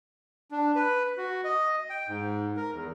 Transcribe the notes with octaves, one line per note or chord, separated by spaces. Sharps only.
D4
B4
F#4
D#5
G5
G#2
A#4
E2